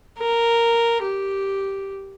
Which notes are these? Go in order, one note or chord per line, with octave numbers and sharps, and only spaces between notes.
A#4
G4